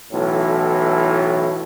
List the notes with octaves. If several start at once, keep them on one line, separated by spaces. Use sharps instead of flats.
B1 A2 E3